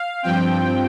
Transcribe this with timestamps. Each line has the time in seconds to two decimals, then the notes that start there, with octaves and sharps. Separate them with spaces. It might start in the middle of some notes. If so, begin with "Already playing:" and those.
Already playing: F5
0.23 G2 F3 C4 G5